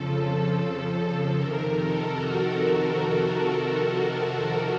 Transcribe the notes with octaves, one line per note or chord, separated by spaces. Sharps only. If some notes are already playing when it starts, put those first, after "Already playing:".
Already playing: F2 C#3 F3 A4
F2 C3 D#3 A#4
A4
F#4